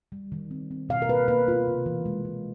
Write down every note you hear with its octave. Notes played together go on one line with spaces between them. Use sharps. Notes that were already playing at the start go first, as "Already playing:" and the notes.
G3
D#3
C4
C4
B2 F5
A#4
A#3 B4
A#3 B4
B2 F4
C3
E3
G#3
E3